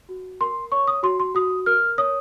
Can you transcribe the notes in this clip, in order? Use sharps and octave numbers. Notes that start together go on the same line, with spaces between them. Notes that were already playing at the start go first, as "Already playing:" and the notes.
F#4
A#4 C6
C#5 C#6
D#6
F#4 C6
C6
F#4 D#6
A#4 F6
C#5 D#6